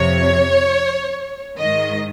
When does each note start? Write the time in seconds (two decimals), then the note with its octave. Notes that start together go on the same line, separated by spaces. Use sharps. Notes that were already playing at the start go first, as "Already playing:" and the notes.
Already playing: F2 C3 F3 C#5
1.58 G#2 D#3 D#5